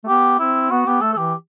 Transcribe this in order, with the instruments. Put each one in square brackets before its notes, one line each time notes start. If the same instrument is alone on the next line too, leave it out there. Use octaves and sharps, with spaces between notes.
[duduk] A3
[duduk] B3 [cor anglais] G4
[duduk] C4 [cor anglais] E4
[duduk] B3 [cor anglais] F#4
[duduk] B3 [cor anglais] G4
[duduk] A3 [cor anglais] A4
[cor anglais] A4
[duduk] E3 [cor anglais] G4